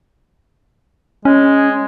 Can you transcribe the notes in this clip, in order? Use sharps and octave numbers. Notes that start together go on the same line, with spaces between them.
G#3 C#4